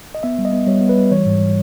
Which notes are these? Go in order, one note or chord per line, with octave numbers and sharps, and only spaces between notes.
D#5
B3 E5
G3
D#5
B3
G3 C#5
B3
B4
G3
E3 C#5
G#2